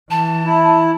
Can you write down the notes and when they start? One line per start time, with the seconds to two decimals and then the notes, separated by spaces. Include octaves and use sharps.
0.10 E3 A5
0.45 E4